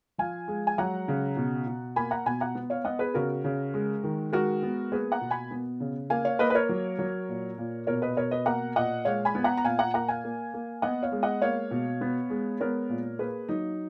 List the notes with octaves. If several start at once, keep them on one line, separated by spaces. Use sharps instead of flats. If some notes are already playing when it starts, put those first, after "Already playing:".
F3 F5 G#5
G#3
G#5
F#3 F#5 A#5
C#3
B2
B2
A#3 G#5 B5
F#5 A#5
B2 G#5 B5
F#5 A#5
B3
C#5 F5
B3 D#5 F#5
G#4 B4
C#3 F#4 A#4
C#3
G#3
D#3
G#3 F#4 A#4
B3
A#3 G#4 B4
F#5 A#5
B2
G#5 B5
B3
C#3
A#3 F5 G#5
C#5 F5
A#3 B4 D#5
B4
A#4 C#5
F#3
F#3
A#2
A#2
B2 A#4 C#5
B4 D#5
B2 A#4 C#5
B4 D#5
A#3 F#5 A#5
A#2 D#5 F#5
G#3 C#5 F5
G#5 B5
B3
F#5 A#5
A#5
A#2 F5 G#5
F#5 A#5
A#3 F#5 A#5
F5 G#5
A#3
A#3
B3 D#5 F#5
C#5 F5
G#3
D#5 F#5
A#3 C#5 F5
B2
B3
G#3
B3 A#4 C#5
A#2
A#3 G#4 B4
F#3 D#4